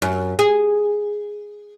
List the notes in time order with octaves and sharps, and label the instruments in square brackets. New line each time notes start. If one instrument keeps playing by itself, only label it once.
[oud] F#2
G#4